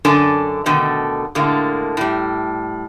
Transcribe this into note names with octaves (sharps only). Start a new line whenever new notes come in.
F#2 D3 D4 A4 D5 G#5
B2 D3 D#3 A3
A2 D3 G#3 A#3
A2 G3